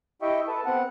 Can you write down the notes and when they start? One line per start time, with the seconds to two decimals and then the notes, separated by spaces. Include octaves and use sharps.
0.22 E4 G4 D#5 E5 G5 C#6
0.48 A4 B4 A5
0.66 B3 C4 F#5